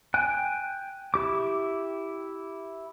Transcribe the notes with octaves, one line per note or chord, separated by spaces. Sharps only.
G5 G#5 F#6
E4 G4 D6